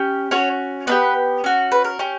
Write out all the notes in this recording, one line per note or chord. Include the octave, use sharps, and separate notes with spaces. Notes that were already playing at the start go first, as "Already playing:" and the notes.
Already playing: C#4 G4
C#4 F#4 C#5
B3 D4 G4 B4
C#4 F#4
B4
A#4
C#4 G4